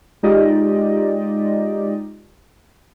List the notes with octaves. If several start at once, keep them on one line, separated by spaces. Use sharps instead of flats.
G#3 D#4 F4 G4 D5 D#5